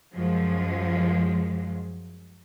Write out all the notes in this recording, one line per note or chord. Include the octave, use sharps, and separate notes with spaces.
F#2 F3 G#3